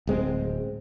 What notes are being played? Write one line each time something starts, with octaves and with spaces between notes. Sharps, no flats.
D1 G#3 C4